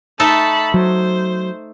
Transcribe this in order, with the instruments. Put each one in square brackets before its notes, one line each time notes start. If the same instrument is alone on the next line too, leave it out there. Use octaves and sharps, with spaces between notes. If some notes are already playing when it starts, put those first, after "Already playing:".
[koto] A3 D#4 A4 [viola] A5 B5
[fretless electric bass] F#3 [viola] C5